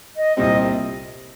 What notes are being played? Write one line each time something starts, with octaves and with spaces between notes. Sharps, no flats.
D#5
C2 A#2 G3 C4 D#5